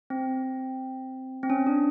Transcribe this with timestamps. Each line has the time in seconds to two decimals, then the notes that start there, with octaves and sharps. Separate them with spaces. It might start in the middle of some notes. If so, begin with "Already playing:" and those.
0.10 C4
1.43 C4
1.50 C#4
1.67 D4